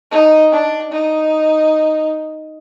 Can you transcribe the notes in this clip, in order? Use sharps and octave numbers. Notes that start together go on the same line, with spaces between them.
D#4
D4
D#4